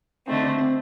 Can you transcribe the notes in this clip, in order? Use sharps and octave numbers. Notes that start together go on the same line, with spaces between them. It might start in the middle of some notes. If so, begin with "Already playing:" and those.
D3 A3 C4 D#4
D4
C4